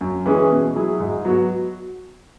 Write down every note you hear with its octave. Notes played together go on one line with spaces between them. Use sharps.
F#2
E3 G#3 C#4 G#4
B2
F#3 E4 G#4
G#2
F#3 B3 F#4